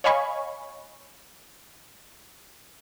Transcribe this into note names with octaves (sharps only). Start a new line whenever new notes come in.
C#5 D#5 F5 G#5 B5 C#6